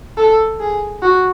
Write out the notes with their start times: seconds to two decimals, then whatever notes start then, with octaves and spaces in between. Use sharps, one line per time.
0.18 A4
0.60 G#4
1.02 F#4